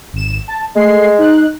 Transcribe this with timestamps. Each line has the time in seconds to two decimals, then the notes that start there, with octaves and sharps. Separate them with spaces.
0.13 G#1 E7
0.48 A5
0.75 G#3 A3 C7
1.18 D#4 F#6